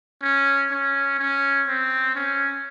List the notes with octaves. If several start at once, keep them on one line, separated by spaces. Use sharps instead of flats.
C#4
C#4
C#4
C4
C#4